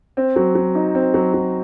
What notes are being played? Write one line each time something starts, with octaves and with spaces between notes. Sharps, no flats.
C4
F#3
F#3
D#4
C4
F#3
F#3